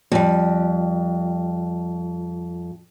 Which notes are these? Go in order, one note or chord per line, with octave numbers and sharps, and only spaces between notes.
F2 G3